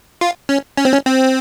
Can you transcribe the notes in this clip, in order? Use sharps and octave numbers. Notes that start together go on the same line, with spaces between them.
F4
C#4
C#4
C4
C#4
C4